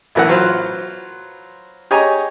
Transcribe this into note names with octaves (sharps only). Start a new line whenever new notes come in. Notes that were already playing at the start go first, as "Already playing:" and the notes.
B1 A2 E3 B3 F#5
F#3 F4 B4 C5
G4 G#4 C#5 D#5 G#5 A#5